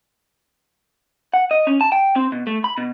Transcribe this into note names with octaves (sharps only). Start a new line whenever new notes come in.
F#5
D#5
C#4
A5
G5
C4
B2
A3
B5
B2